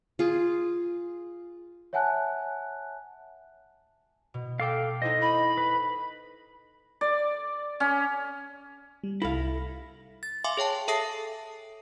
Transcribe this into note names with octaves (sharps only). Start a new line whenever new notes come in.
F4 G#4
C#5 E5 F#5 G#5 A5 F#6
B2
A4 F5 G5 D6
D#4 E4 C5 D#5
B5
B4
D5
C#4
G3
C2 E4 A4 F5 A#6
A6
E5 F5 G#5 C6 D6
G#4 C#5 G5 A5
A4 E5 A5 D#6 A#6 C7